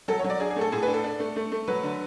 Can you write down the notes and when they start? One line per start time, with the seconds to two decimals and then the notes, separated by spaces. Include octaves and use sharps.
0.08 F#3 A4
0.19 C#5
0.24 F#3
0.30 D5
0.40 D4 G#4
0.50 G#4
0.56 A3
0.61 A4
0.72 A2 G#4
0.83 B4
0.88 D4
0.94 A4
1.04 D4
1.20 A3
1.36 A3
1.52 A3
1.68 F#3 B4
1.83 D3